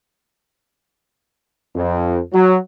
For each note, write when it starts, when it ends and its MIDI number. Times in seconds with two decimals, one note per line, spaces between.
1.75 2.20 41
2.33 2.56 54